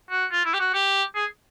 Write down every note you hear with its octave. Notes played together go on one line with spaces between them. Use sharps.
F#4
F4
E4
G4
F#4
G4
G#4